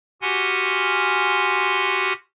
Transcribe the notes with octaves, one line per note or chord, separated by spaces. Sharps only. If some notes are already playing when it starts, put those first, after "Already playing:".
F#4 G4 F#5 G#5 C6 F6